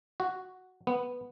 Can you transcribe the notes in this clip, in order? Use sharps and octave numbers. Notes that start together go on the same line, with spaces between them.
F#4
B3